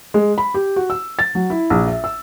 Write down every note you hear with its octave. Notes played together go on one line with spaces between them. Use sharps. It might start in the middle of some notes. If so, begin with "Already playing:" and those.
G#3
B5
G4
F#4
E6
A6
F#3
E4
A#1
E5
E6